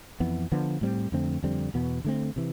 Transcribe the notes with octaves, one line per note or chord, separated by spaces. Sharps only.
F2 E3 B3
D3 F3 B3
A2 G3 C4
F2 D3 A3 C4
F2 D3 G3 C4
E2 B2 B3
D3 A3 C4
C3 E3